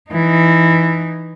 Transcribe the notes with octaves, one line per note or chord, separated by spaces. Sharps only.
E3 D#4